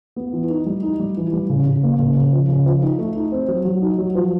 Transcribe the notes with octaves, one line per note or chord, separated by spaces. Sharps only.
B3
E3
D#4
G3
D#4
G3
E3
G3
C#3
C#3
A#3
C#3
C#3
F3
C#3
F3
D#4
A3
D#4
C4
F#3
F#3
D#4
F#3
F3